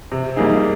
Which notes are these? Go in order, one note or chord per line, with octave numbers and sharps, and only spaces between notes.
C3
G3 A#3 D#4 G#4